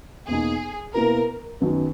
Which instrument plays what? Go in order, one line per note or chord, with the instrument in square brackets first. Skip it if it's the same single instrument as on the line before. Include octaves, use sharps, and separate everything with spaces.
[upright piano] E2 B2 A#3 D#4 [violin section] G#4
[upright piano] B2 A#3 E4 B4 [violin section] A#4
[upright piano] F#2 D#3 F#3 B3